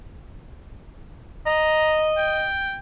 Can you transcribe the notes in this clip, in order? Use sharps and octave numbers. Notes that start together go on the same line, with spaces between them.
D#5 A#5
G5